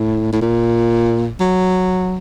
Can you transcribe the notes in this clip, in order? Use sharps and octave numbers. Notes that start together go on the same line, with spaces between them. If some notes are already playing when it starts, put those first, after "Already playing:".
Already playing: A2
A2
A#2
F#3